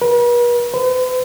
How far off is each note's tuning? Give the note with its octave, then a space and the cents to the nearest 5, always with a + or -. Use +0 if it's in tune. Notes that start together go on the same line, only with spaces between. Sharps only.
B4 -45
B4 +45